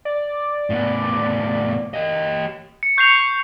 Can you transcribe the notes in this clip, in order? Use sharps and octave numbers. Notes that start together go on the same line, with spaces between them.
D5
A2 B3
G4 D#5
C#7
C#6 G6 C7 F7